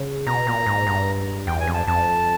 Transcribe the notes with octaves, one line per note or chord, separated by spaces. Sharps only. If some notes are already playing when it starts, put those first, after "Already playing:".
Already playing: C#3
B2 A#5
A#2
G#2
G2
E2 G5
G#5
F2
A5
F2 A5